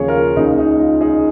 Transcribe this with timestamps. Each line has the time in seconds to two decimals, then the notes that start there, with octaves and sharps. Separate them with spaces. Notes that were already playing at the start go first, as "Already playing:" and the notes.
Already playing: D#2 C#3 F3 A#3 G#4 C#5
0.08 F4 A#4
0.36 C#2 C#3 A#3 D#4 G#4
0.59 D#4
0.80 F4
1.01 D#4 G#4